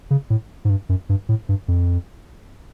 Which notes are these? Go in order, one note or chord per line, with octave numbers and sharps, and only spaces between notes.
C#3
A2
G#2
G2
F#2
G2
A2
G2
F2